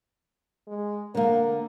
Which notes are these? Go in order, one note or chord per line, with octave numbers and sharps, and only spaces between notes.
G#3
D3 A#3 A#4